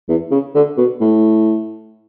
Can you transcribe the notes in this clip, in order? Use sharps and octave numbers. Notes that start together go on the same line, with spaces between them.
E2
C#3
D3
B2
A2